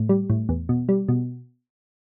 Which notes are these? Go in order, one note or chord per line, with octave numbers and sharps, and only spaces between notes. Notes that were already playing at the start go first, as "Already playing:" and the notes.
Already playing: A2
G3
A2
E2
B2
G3
B2